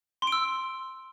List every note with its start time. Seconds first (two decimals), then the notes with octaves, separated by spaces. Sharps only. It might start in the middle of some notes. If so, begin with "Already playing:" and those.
0.22 C6
0.27 D7
0.32 E6